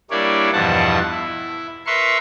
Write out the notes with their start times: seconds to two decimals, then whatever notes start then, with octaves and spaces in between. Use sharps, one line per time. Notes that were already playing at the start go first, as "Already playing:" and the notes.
0.11 G3 A#3 D4 E4 C#5 D5
0.52 E2 G2 B2 F3 F#5 A5
1.11 E4
1.86 A#4 B4 E5 C6 C#6